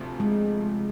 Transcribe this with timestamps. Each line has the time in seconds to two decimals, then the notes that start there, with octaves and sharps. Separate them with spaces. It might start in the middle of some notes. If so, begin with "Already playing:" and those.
Already playing: D2 C3 F3 A3
0.20 G#3